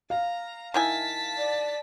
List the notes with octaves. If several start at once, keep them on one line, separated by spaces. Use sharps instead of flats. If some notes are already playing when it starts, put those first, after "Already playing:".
F5 A#5
D#3 E4 G#5 A5 B6
D5